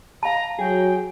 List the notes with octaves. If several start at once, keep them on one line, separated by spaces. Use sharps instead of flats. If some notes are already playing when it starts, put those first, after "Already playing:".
F5 A5 A#5
F#3 G#4 G5